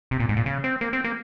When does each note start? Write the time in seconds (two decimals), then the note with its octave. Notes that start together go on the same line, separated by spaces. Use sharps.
0.11 C3
0.20 A#2
0.29 G#2
0.37 A#2
0.46 C#3
0.64 C4
0.81 A#3
0.93 C4
1.04 A#3